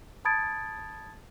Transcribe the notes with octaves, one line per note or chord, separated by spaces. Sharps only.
A5 B5 D#6 G#6 A6 D7